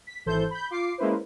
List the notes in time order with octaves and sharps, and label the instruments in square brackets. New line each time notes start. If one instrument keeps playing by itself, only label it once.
[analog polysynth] B6
G#1 E3 A4 C5 G6
B5 G6
F4 D6 C7
G#3 A#3 C#4 E4 B4 C5